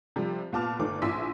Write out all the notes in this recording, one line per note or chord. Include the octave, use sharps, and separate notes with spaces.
C3 F3 G3
A#2 B3 A5 D6 F6
G1 D#3 A3 D4 D6
A#1 E4 C6 E6 B6